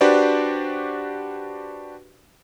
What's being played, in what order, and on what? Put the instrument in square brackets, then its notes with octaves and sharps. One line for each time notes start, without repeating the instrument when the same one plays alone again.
[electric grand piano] D4 F#4 G4 B4 C5 D5